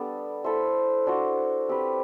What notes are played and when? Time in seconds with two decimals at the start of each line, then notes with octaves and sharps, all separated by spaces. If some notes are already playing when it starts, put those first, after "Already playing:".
Already playing: G3 B3 D4 A4
0.44 E4 A4 C5 E5
1.07 D4 F#4 C5
1.69 C4 G4 B4